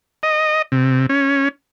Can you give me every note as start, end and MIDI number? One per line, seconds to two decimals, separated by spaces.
0.23 0.62 75
0.72 1.06 48
1.09 1.49 61